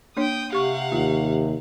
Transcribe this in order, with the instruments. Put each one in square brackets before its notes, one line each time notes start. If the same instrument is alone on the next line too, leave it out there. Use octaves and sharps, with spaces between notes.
[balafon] A#3 D4 C#5 [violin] G5 D#6
[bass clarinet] C3 [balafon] G4 C#6 [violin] F5 F#5
[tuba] D#2 [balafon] F4